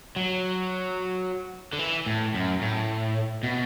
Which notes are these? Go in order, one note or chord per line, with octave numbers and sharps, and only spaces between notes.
F#3
D3
E3
A2
F#2
A2
B2